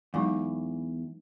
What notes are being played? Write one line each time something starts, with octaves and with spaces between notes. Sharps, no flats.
E2 F#3 G#3 D#4